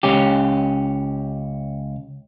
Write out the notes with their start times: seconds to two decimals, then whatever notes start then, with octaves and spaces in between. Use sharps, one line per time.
0.03 C#2 C#4 G4